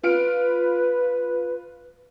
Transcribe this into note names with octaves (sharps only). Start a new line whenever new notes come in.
F4 B4 F6 D7